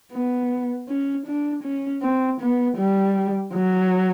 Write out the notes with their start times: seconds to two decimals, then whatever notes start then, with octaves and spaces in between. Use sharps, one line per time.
0.12 B3
0.88 C#4
1.26 D4
1.63 C#4
2.02 C4
2.40 B3
2.77 G3
3.53 F#3